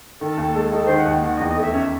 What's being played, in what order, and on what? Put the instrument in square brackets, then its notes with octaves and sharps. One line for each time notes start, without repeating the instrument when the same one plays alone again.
[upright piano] D#3 [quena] A4
[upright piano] D#2
G#3
[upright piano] D#4 [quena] A4
[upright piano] D#3 [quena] C5
[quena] F#5
[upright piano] D#2
[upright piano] D#3 [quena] F#5
[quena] D#5
[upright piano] E2
[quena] D#5
[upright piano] A3 [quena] E5
[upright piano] C#4 [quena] E5